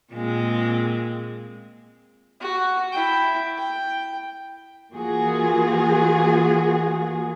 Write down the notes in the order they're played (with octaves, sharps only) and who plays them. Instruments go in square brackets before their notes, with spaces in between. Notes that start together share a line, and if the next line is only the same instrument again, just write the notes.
[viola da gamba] A#2 G#3 C4
[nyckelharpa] F#4
E4 G5
G5
[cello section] E3 A#3 F4 F#4 G#4